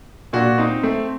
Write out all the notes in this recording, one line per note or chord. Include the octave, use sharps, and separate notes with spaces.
A#2 D4 F#4
C4 D#4
A3 C4